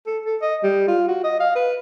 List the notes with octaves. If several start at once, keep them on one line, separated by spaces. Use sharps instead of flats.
A4
A4
D#5
G3
F4
F#4
D#5
F5
B4